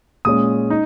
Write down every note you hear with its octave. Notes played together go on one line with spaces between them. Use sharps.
A#2 G#3 C#4 D#6
D#4